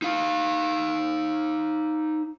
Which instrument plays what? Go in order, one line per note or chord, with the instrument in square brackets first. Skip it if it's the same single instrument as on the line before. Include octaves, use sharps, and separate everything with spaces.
[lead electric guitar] D#4 F5